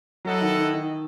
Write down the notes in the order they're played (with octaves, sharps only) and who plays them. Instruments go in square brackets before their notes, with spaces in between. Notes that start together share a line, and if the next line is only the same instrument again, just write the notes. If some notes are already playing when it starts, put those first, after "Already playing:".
[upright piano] F#3 [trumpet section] E4 A4 D#5 F#5
[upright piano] D#3
D#3
D#3